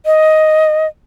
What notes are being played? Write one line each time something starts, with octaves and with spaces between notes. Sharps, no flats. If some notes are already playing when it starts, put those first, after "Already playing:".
D#5